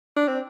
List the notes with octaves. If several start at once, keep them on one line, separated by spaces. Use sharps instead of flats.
D4
C4